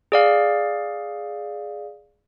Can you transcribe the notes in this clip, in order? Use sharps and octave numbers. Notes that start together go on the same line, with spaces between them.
G#4 D5 F5